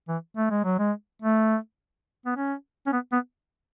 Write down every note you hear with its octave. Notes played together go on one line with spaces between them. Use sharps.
E3
A3
G#3
F#3
G#3
A3
B3
C#4
C#4
B3
B3